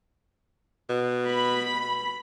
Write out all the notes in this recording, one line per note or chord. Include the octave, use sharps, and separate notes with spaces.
B2
B5